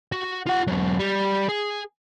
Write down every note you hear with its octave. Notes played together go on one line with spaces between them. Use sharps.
F#4
F4 F#5
E2 F#3
G3
G#4